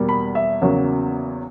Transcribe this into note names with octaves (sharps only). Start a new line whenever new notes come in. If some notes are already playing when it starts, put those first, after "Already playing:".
Already playing: E2 B2 G3 A#3
B5
E5
E2 C#3 F#3 A#3